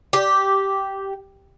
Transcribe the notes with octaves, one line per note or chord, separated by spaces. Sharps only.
G4